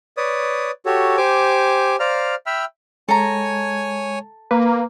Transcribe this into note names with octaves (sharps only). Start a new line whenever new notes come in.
B4 C#5 D5 D#6
F#4 G4 A4 C#5
G4 C5 G#5 D6
C5 D5 F5 A#5 F6
E5 G5 B5 E6 F6
G#3 A4 C#5 G#5 A#5
A#3 B4